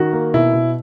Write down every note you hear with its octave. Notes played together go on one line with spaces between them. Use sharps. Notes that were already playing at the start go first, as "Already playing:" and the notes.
Already playing: D#3 F#4
A#3
B2 E4
B2